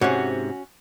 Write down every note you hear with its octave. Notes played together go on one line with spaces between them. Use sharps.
G#2 C3 C#4 F#4